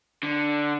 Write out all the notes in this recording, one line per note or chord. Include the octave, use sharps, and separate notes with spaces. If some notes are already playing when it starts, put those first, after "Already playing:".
D3